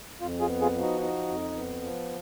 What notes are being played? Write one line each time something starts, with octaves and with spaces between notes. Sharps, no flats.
F2 F4
F4 G#4
B3
F4 G#4
F3
D#4 F#4
D#4
F2
B3
F3